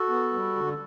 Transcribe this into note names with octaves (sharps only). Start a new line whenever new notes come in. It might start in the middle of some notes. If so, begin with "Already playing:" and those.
Already playing: F#4 A4
B3
G3
D3